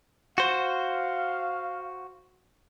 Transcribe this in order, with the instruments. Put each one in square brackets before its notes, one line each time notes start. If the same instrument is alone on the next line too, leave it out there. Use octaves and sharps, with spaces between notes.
[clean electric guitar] F#4 C5 [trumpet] F5